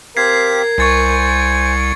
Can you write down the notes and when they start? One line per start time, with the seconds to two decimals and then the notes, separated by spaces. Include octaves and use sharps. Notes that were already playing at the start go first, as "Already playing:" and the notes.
0.17 C4 G4 A#4 F5 G#6 B6 C7
0.78 C2 C5 G#5 C#6 A6 C7 C#7